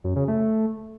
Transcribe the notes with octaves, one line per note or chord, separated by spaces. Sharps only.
F#2
C#3
A3